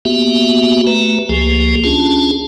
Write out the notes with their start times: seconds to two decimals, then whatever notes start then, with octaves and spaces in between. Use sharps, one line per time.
0.05 A#3 B3 F#4 G4 E5
0.87 A3 B4 A#5
1.29 C#2 F3 A#3 G4 G#4
1.84 C#4 D4 F4 G#4 A5